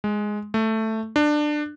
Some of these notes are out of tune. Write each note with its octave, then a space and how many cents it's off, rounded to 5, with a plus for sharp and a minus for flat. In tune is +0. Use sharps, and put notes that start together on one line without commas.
G#3 +5
A3 +5
D4 +20